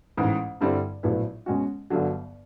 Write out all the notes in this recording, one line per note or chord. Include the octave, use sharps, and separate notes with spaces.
A1 G#2 E3
G2 D3 G3 C4 E4
A#1 A2 F#3 B3 E4
B2 G#3 C#4 F#4
G1 G2 D3 F#3